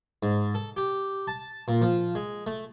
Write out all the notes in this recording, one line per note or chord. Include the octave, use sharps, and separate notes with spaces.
G#2
A4
G4
A5
A#2
F3
G#3
A3